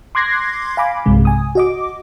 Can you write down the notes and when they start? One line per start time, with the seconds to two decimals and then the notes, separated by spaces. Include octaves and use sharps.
0.15 C6 D6 F#6 G#6 A#6 C7
0.77 F5 G#5 B5 D6
1.06 B1 G2 C3 G#3
1.25 G#5 D#6
1.55 F#4 D#5 D6